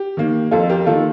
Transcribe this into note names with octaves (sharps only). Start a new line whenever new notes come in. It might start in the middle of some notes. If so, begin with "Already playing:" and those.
Already playing: G4
D#3 A#3
F2 F4 A4
G4 A#4
D#3 A#3 F4 A4